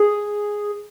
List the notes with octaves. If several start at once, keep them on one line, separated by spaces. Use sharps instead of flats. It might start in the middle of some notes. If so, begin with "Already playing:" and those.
Already playing: G#4